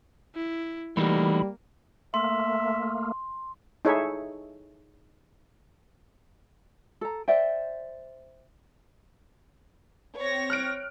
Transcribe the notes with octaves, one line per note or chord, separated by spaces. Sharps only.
E4
E3 G3 A3 A#3 D#4 F#4 B5
A3 A#3 E5 C6
D#4 E4 G#4 A4 C#5 E5
A4 A#5
C5 D5 E5 G5
C4 C#5 A#6
F6 F#6 D7